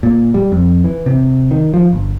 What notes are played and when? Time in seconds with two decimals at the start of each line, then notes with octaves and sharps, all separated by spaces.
0.03 A#2
0.34 G3
0.52 F2
0.84 E3
1.06 C3
1.51 D#3
1.74 F3
1.93 G1